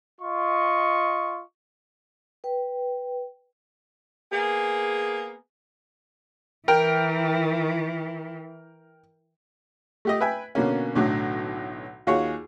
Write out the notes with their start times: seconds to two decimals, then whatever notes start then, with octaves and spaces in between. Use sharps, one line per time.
0.20 F4 D#5 C#6
2.44 B4 G5
4.31 A#3 B3 G#4
6.68 E3 A#4 G5
10.05 A3 G4 D#5
10.20 B4 E5 G5 G#5
10.55 B2 D3 A#3 C#4
10.95 B1 A2 D3 F#3
12.07 D#2 F4 F#4 G#4 C#5